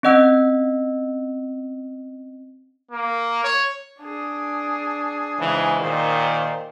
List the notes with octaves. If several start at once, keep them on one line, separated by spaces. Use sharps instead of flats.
C4 C#4 D#5 F#5 E6
A#3
C#5
D4 G#4
G#2 C#3 E3
A#2 D#3 C5